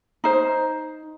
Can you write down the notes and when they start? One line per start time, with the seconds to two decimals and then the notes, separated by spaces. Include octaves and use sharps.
0.24 D#4 C5